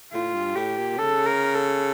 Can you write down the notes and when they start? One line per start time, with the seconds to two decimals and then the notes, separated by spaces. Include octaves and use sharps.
0.13 A2 F4
0.35 G2
0.55 A2 G4
0.78 A#2
0.98 C#3 A4
1.26 A#4
1.55 A4